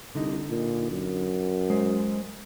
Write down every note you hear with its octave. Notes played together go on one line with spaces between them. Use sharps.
C2 D3 D#4
A#2
F#2
G#3 C5